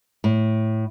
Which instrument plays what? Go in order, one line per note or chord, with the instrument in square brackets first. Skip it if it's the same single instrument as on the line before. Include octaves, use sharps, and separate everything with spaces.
[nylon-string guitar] A2